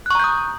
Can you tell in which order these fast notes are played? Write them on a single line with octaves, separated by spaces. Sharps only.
F#6 C#6 A#5 G6 D#6